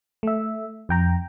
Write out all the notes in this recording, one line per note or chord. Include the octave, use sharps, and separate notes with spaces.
A3 E5
F2 G5 A#5